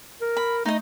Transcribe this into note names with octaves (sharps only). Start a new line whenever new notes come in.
A#4
B5
A3 D#4 D#5